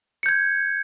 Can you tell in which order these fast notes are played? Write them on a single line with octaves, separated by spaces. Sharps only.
C#7 G6 G#6